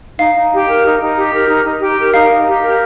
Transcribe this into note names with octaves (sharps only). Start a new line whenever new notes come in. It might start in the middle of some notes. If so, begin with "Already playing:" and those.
D#4 F5
D#4
G4
A#4
D#4
D#4
G4
A#4
D#4
D#4
G4
A#4
D#4 F5
D#4
G4
A#4